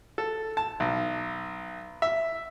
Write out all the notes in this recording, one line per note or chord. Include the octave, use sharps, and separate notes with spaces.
A4
A5
B1
E5